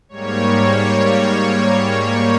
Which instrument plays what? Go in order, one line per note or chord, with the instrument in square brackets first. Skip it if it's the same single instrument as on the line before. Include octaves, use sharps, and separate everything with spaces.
[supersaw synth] G#2 G3 A#3 C#5